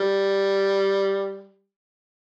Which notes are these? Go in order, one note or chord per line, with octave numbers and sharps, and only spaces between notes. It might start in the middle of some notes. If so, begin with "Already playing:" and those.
Already playing: G3